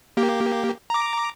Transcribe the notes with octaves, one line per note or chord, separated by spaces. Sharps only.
A#3 G4
A#5 D6